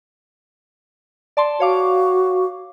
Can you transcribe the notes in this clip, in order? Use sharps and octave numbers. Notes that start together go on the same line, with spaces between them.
D5 A5 C6
F#4 C#5 F5 D6